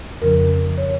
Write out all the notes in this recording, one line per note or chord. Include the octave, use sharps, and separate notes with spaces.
F2 C#3 F3 C#4 A#4
C#5